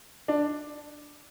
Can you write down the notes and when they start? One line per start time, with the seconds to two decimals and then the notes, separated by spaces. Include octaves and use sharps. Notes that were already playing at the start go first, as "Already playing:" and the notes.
0.28 D4